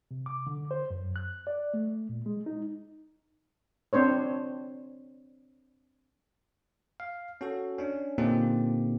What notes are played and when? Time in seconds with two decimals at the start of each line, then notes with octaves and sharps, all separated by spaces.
0.11 C3
0.26 D6
0.47 D3
0.71 C5
0.90 F#2
1.16 F#6
1.47 D5
1.74 A3
2.09 A#2
2.26 G#3
2.46 D#4
3.93 C4 D4 C5 C#5
7.00 F5
7.41 C#4 F#4 A4
7.78 C#4 D4
8.18 A#2 D3 A#3 C4 D#4 G4